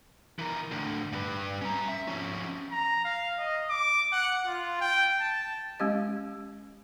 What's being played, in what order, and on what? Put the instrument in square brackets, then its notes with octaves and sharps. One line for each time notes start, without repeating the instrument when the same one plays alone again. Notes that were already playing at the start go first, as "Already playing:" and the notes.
[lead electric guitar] E3 A#4
A2 D3
G2 B4
C#4 A#5
E5
F3 C#4
[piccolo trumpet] A#5
F5
D#5
D6
F#5
F4
G5
A5
[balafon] G#3 C#4 G4 D#5